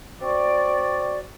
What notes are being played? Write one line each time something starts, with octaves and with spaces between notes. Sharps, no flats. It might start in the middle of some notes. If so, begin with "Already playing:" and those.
C4 F#4 D5